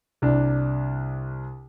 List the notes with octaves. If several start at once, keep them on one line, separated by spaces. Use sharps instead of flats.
C2 D4